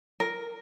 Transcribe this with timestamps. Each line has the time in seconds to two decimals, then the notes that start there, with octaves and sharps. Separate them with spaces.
0.20 A#4